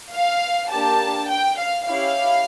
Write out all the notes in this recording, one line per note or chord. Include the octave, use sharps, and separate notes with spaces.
F5
A#3 D4 G4 A5
G5
F5
C#4 E4 G4 F5